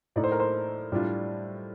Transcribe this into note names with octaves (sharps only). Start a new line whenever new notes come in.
A2 A3 D#4 D5
C5
A#4
C5
A2 G3 D4 F4